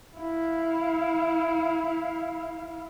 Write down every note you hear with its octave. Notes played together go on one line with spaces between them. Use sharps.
E4 F5